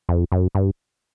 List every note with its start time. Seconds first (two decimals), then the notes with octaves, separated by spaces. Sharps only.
0.09 F2
0.32 F#2
0.55 G2